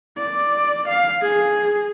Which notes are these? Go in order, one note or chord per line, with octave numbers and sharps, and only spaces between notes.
D5
F5
G#4